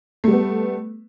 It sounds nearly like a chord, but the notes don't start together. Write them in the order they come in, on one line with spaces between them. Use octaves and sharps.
A3 G3 B3